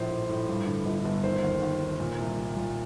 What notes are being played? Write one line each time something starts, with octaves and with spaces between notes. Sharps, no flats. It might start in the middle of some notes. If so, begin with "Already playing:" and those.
Already playing: A#1 A2 C5
A#1
A2
G2
D3
G1
G1
D#3 C5
D#2
D#2
D#3
A#2
C2
C2
A#2